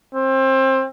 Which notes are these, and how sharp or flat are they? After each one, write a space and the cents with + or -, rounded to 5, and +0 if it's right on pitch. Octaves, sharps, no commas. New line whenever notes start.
C4 +25